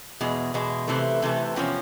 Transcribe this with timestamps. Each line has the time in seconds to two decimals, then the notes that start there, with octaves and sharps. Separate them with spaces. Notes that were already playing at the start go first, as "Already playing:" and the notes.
0.21 E2 B2 G#3
0.54 E2 B2 G#3
0.88 C3 E3 A3
1.22 C3 E3 A3
1.56 E2 C3 F3 C#4